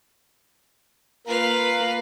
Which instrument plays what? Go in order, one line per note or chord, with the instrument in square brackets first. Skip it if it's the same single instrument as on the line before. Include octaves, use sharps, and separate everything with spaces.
[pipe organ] A#3 F4 A#4 [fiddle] B4 F5